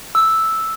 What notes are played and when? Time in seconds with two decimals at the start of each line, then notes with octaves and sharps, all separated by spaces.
0.15 E6